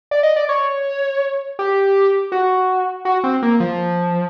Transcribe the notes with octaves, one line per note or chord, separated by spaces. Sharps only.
D5
D#5
D5
C#5
G4
F#4
F#4
C4
A#3
F3